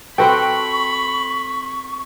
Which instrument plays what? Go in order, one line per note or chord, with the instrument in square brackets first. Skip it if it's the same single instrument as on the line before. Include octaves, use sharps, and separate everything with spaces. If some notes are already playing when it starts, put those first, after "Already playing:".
[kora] C4 F#4 A4 [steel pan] B4 G5 [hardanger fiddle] B5 [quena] C#6